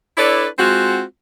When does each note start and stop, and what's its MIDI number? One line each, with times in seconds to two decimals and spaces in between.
0.17 0.46 62
0.17 0.46 64
0.17 0.46 69
0.17 0.46 71
0.17 0.46 73
0.17 0.46 74
0.58 1.02 56
0.58 1.02 60
0.58 1.02 65
0.58 1.02 66